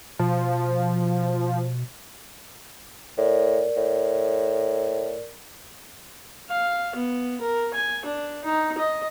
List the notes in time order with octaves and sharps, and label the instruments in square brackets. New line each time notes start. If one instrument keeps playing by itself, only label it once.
[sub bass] B2 [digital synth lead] F3
[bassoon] A2 [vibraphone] A#4 D5
[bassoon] A2
[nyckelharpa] F5
B3
A#4
G#5
D4
D#4
D#5